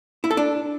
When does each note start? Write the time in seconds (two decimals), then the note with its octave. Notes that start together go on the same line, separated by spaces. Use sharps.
0.24 E4
0.31 A4
0.37 D4